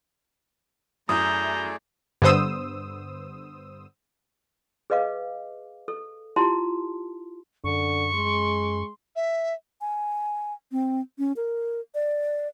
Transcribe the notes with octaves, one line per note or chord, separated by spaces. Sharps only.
F#2 A3 E4 G#4 D5 A#5 D#6 G6
G2 D3 B3 C5 D#6 E6
G#4 B4 D#5 F5 D6
A4
E4 F4 G4 A5 C6
F#2 D3 C#6
G#3 C6
E5
G#5
C4
C#4
A#4
D5